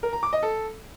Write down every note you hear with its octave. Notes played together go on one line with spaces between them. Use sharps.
A#4
A#5
D6
D#5
A4